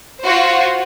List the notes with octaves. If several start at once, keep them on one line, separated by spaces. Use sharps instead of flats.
F4 F#4 C5